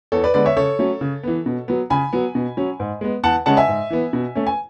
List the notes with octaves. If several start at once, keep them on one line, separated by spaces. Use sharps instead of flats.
E2 A4 C#5
B4 D5
D3 G#3 B3 B4 D5
C#5 E5
C#3 A4 C#5
F#3 A3 C#4
C#3
E3 B3
B2
F#3 B3
C#3 G#5 B5
F#3 B3
B2
F#3 C#4
G#2
G#3 B3
E2 F#5 A5
C#3 G#3 C#4 F#5 A5
E5 G#5
G#2
E3 B3
B2
A3 C#4
G#5